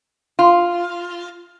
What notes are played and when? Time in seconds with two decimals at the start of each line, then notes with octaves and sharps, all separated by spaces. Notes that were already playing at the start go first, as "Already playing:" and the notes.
0.39 F4